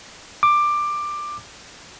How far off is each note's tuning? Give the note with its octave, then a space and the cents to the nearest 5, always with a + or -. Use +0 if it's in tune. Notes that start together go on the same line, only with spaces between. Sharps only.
D6 +15